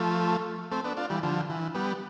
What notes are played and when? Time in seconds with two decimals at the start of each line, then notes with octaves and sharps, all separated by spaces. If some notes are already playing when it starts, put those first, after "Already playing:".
Already playing: F3 A3
0.71 A3 C4
0.84 B3 D4
0.97 D4 F4
1.10 E3 G3
1.23 D3 F3
1.50 E3
1.74 G3 B3